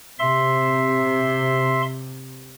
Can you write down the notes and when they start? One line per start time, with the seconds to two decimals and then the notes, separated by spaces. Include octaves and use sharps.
0.19 C3 E5 C6